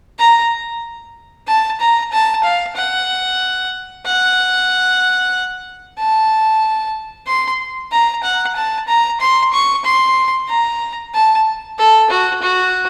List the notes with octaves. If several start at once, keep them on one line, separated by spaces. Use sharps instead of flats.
A#5
A5
A#5
A5
F5
F#5
F#5
A5
C6
A#5
F#5
A5
A#5
C6
C#6
C6
A#5
A5
A4
F#4
F#4